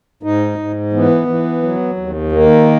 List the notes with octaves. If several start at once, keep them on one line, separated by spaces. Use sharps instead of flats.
G#2 D#4
G#2
E3 B3
E3
F#3
D#2
D#3 A#3